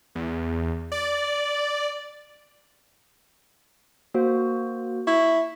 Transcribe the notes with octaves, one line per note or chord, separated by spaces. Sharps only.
E2
D5
A#3 F#4 C5
E4 C#6